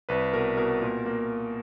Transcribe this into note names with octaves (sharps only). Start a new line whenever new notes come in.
C2 B4
B2 A#4
B2 A#4
A#2
A#3